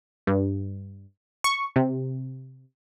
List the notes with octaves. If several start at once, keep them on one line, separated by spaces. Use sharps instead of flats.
G2
C#6
C3